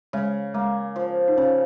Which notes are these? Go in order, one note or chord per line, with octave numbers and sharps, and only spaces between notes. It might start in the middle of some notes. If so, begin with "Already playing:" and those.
C#3 G#3
G#3 A#3
F3
D#4
C#3 C#4